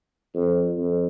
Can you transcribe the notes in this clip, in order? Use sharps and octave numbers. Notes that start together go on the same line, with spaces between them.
F2
F2